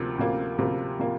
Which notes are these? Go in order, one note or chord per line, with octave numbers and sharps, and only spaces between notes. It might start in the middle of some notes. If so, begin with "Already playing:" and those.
Already playing: D2 C3 F3 A#3
D2 C3 F3 A#3
D2 C3 F3 A#3
C3 F3 A#3